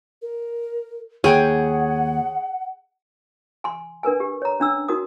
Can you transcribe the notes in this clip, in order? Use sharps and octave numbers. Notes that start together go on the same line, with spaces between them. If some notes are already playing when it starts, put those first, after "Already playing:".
A#4
D#2 G#4 C#5 F#5 G5
G#5 C6
D4 A#4 B4 G#5
G4
C#5 A#5
C#4 D4 E6
D#4 F#4 A#4 D#6